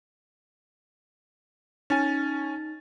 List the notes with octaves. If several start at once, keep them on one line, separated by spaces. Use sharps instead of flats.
C#4 D#4 G#5 A6